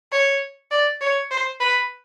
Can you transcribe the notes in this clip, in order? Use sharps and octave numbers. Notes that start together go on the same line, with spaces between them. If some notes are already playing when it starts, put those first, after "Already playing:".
C#5
D5
C#5
C5
B4